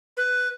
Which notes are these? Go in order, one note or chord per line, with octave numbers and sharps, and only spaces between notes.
B4